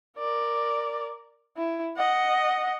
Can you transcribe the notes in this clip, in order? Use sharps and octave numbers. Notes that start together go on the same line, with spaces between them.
A#4 D5
E4
D#5 F#5